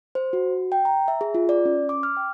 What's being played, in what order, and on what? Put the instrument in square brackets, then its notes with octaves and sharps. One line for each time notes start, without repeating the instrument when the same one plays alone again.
[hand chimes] C5
F#4
G5
A#5
E5
G#4
F4
D5
C#4
D6
F6
G5